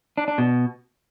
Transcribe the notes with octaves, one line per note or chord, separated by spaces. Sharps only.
D4
D4
B2